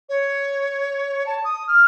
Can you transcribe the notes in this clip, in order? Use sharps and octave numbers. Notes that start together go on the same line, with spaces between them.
C#5
A5
D#6
F6